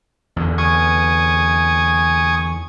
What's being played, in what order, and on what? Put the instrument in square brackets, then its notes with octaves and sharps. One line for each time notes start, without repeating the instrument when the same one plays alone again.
[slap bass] E2 D3
[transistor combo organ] G#5 C#6 D#6